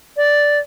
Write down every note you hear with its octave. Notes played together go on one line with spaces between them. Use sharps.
D5